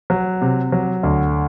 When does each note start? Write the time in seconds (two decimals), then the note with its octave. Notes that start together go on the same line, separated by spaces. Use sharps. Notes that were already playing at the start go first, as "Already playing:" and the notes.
0.10 F#3
0.41 C3
0.72 F#3
1.03 D2